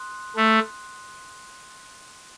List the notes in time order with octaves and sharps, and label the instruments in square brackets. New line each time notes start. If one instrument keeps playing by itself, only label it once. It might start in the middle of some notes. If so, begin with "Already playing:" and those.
Already playing: [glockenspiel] C6 D#6 F#6
[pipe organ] A3